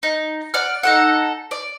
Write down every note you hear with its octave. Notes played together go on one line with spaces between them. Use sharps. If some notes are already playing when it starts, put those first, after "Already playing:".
D#4
D5 F#5 F6
D#4 A4 F#5
D5